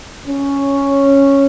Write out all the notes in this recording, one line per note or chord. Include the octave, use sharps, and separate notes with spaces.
C#4